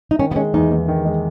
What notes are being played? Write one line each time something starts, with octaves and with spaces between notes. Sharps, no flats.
D#4
D#3 C#4
B3
G#3 C#4
E2 D#4
E2
D#3
G#3